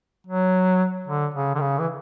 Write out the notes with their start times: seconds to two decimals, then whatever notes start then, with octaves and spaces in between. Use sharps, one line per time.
0.27 F#3
1.07 D3
1.34 C#3
1.55 D3
1.60 C#3
1.80 E3